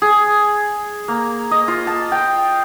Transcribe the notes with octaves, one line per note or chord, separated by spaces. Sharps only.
G#4
A#3
D#5
F4
A5
G5